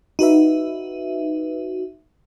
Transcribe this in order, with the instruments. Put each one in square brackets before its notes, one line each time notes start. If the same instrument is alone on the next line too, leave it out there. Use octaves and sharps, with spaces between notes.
[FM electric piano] D#4 F#4 B4 E5